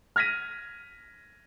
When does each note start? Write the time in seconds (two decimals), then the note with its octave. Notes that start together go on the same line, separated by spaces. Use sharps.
0.16 F6 G#6 A#6 B6 D#7